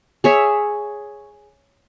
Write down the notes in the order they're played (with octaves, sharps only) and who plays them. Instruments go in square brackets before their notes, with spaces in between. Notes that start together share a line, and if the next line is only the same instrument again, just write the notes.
[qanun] G#4 C#5 E5